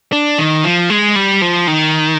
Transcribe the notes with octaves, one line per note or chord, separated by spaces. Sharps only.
D4
D#3
F3
G#3
G3
F3
D#3